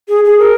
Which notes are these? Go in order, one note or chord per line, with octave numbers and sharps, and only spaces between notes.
G#4
G#4
A#4